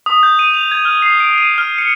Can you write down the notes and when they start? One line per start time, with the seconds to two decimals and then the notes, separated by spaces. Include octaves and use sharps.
0.06 D#6
0.23 G6
0.39 D#7
0.54 F7
0.71 G#6
0.85 F6
1.02 C7
1.20 D7
1.38 D#7
1.58 F6
1.78 C#7